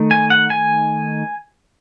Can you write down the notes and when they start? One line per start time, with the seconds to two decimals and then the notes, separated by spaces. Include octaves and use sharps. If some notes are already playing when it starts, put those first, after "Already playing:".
Already playing: D#3 A3 D#4
0.11 G#5
0.30 F#5
0.50 G#5